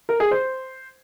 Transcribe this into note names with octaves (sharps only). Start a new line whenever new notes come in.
A#4
G#4
C5